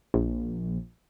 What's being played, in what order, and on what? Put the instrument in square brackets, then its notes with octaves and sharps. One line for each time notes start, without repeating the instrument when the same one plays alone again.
[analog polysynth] A#1